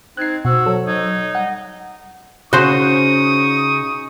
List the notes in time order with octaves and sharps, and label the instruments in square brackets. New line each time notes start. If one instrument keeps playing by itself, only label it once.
[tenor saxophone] C4 [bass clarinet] D#4 [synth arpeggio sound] F#6 C7 [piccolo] G#6
[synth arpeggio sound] B2 [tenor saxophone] F#4 [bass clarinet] C5 [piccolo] E6
[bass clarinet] F#3 [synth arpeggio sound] A4
[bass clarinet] F#3 [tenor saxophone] D#4 [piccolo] G#6
[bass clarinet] G3 [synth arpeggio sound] F#5 [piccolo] A#5
[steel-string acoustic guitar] C#3 [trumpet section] D#4 C#6 D#6 [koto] F#4 C5